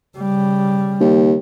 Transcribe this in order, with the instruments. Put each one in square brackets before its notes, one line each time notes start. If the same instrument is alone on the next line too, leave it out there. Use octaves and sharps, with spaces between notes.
[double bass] C#3 G3
[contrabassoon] D#2